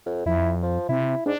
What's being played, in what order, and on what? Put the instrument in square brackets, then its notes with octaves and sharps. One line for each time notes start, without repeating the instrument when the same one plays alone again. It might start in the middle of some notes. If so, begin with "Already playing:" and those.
[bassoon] F2
[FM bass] F2 [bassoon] E4
[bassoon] F3
[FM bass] C3 [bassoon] E4
[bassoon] G#2 [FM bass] D4